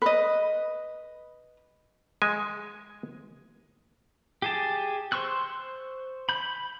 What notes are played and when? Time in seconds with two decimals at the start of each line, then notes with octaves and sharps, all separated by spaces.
0.02 B4 D#5
2.22 G#3 G#5
4.42 G4 G#4 A5
5.12 C5 C6 C#6 E6 F#6
6.29 B5 G6